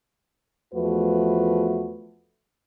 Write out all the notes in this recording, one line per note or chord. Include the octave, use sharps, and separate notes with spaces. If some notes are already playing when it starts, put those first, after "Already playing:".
E2 F3 A3 F#4 B4